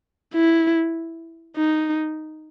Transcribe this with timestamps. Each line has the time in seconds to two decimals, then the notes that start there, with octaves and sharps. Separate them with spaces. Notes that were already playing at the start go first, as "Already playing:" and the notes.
0.34 E4
1.57 D#4